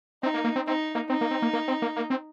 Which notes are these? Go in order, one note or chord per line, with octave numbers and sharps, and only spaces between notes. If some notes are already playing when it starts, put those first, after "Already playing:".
C4 D#4
A#3
A#3
C4
C4 D#4
A#3
C4 D#4
A#3
C4
A#3
A#3
C4
A#3
A#3
C4